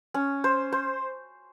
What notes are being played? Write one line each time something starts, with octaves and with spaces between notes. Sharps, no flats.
C#4
C5
C5